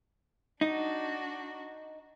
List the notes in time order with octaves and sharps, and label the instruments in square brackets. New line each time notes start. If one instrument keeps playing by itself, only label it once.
[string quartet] D4 F#4 [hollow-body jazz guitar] D#4